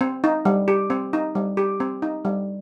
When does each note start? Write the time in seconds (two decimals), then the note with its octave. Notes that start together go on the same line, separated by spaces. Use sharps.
0.01 C4
0.24 D#4
0.45 G3
0.68 G4
0.90 C4
1.13 D#4
1.35 G3
1.57 G4
1.80 C4
2.02 D#4
2.25 G3